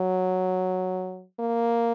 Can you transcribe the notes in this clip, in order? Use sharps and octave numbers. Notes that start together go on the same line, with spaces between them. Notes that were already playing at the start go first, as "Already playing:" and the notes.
Already playing: F#3
A#3